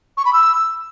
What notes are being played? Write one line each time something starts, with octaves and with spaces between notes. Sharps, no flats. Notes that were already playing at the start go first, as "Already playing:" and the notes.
C#6
B5
E6